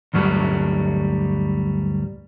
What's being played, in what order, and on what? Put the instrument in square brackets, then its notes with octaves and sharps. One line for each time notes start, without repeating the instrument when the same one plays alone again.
[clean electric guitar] D2 G2 F#3 G3